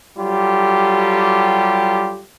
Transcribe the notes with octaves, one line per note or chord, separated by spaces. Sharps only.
F#3 G3 F4 G4 A4